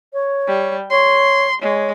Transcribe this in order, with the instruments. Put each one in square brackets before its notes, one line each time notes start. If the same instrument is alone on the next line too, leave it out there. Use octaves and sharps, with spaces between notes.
[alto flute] C#5
[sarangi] G3
[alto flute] C#5 [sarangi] C6
[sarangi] G#3 [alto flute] C#5